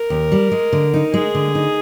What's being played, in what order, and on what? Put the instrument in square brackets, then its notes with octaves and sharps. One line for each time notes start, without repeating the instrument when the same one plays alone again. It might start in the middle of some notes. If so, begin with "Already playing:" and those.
Already playing: [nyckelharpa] A#4
[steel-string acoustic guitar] D#2
G3
G#3
D3
D#4
[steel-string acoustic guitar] G#3 [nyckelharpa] G#4
[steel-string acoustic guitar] D3
D#4